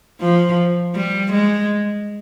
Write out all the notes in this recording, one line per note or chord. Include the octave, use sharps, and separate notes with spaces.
F3
G3
G#3